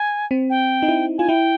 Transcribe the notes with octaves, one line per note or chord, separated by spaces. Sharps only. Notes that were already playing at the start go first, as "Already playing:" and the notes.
Already playing: G#5
C4
G5
D#4
E4
F4 G#5
E4 G5